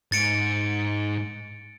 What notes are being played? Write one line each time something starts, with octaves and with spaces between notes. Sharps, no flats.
G#2 A6 C#7 D7